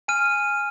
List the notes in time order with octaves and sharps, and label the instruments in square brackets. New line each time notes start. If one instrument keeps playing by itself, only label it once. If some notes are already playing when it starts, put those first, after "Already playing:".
[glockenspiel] G#5 F6 D#7